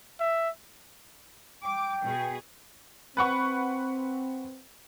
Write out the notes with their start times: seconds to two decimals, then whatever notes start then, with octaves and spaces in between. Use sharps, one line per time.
0.20 E5
1.63 G5 D6
2.03 B2 G#4
3.17 C4 B4 F#5 C#6